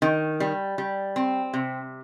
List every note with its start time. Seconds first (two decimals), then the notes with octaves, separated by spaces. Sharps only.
0.02 D#3
0.40 G3
0.78 G3
1.16 C4
1.54 C3